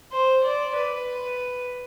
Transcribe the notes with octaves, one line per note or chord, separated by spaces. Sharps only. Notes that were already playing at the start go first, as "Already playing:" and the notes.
C5
D5
B4